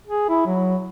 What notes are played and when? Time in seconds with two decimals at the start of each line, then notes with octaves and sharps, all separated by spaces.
0.07 G#4
0.29 E4
0.47 F#3